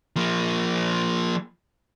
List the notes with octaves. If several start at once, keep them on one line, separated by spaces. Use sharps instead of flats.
F3 A#3